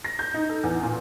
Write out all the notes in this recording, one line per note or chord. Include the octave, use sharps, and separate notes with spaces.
A#6
G6
D#4
A4
E2
A#2